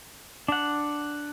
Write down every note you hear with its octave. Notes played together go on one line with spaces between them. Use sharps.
D4 F#5